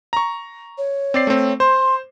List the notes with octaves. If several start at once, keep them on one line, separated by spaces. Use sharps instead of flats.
A#5 C#6
C#5
C4 D5 C7
A3 C4
C5 C6